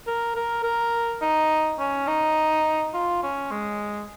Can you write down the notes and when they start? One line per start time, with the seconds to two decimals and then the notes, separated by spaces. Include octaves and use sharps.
0.07 A#4
0.36 A#4
0.63 A#4
1.21 D#4
1.79 C#4
2.07 D#4
2.94 F4
3.23 C#4
3.51 G#3